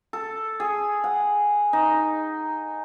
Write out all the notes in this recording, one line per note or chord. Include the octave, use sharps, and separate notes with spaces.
A4
G#4
F#5
D#4